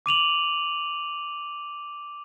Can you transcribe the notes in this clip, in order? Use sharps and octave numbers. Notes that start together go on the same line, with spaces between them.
D6 D#7 F7 F#7